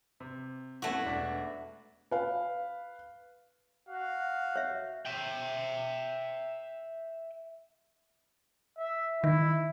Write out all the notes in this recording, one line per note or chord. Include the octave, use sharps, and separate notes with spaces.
C3
A3 B3 C#4 E4 F#4
E1 D4 B6
B4 F5
F#4 F5
C#5 E5
E5 G5
E5
D#3 E4